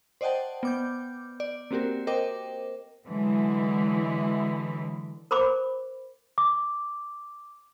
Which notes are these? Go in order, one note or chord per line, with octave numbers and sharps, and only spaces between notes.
C5 D5 D#5 F#5 G5 A5
B3 D6 G6
D5
A#3 C4 F#4 G4 A#4
A#4 C5 D#5 G5 D6
D3 E3 F#3 G#3 E4
A#4 C5 B5 D6
D6